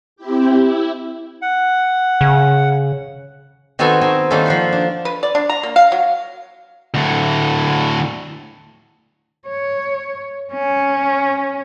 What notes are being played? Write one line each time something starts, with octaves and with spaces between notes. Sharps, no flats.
C4 E4 G4
E4
F#5
C#3
D#3 B3 C4 F#4 A4 G#5
C4 D#4 G#5
D#3 G3 A#3 C#4 A4
F3 F#5 C6
D4
B4
D5
D4
A#5
A#3
F5
F#3
D2 A2
C#5
C#4